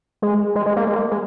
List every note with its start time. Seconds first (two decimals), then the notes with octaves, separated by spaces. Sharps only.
0.22 G#3
0.55 G#3
0.66 G#3
0.76 A#3
0.87 G#3
0.95 A#3
1.11 G#3